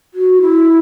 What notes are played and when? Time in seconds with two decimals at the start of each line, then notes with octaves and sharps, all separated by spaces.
0.14 F#4
0.41 E4